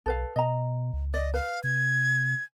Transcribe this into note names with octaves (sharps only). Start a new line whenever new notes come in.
B1 A4 B4 F5
B2 D#5 A#5
C#2
D5 D#5
B4 F5
C3 G#6